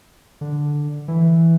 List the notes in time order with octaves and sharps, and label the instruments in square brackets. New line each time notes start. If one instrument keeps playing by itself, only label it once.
[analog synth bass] D3
E3